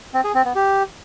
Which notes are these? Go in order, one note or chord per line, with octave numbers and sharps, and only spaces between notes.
C4
G#4
C4
B3
G4